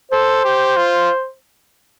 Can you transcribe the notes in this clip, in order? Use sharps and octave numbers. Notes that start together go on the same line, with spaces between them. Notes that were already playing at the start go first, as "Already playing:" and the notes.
A4 C5
G4
F4